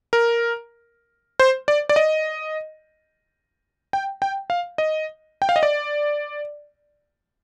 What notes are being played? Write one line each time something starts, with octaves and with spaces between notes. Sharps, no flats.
A#4
C5
D5
D5
D#5
G5
G5
F5
D#5
G5
F5
D#5
D5